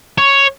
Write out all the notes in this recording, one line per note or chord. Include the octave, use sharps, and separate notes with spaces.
C#5